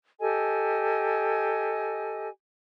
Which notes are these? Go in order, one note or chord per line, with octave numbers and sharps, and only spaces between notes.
G4 A4 D#5 G#5